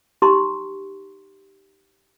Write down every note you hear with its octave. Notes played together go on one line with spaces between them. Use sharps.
D#4 G4 A#5 C6 C#6